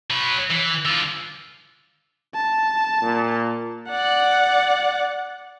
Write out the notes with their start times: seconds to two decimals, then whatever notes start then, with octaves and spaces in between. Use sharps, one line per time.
0.10 F#3 B4
0.50 E3
0.85 D3 F4
2.34 A5
3.02 A#2
3.90 D5 F#5